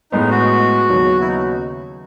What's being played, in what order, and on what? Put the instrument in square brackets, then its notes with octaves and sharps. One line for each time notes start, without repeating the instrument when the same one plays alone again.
[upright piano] A2 G#3 B3 [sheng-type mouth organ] D#4
[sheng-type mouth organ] F#4
[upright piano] D#2 C#3 F#3 B3
[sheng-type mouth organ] E4
D#4